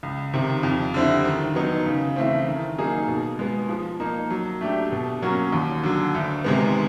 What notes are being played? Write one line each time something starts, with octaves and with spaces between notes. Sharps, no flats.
C#2
C3 D#3
F2
D3 G3 C4 E4
D#3
F#3 B3 D#4
C#3
E3 A3 C4
D#3
F#3 A#3 D#4 G#4
B2
G#3 B3
F3
A#3 D#4
F#3
A3 D4 G4
B2
F#3 A#3 C#4 F#4
D#2
D3 F#3
D2
C3 D#3 G#3 B3